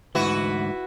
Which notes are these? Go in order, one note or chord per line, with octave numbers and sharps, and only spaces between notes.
D2 G#2 E3 E4 F#4 B4